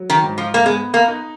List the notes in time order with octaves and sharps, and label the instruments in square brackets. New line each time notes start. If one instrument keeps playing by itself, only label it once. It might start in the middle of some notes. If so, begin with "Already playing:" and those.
Already playing: [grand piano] F#3
[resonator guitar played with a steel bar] D#3
[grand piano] G#2
[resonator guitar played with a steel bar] F3
A#3
[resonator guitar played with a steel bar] G#3 [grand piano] B3
[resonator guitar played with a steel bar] A#3
[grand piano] D#4